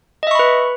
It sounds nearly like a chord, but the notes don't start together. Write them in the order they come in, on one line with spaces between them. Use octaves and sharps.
D#5 E5 C#6 B5 B4